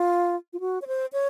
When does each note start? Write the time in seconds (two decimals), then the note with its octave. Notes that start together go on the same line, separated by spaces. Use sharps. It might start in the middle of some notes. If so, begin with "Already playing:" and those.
Already playing: F4
0.53 F4
0.60 F#4
0.82 C#5
0.87 C5
1.13 C#5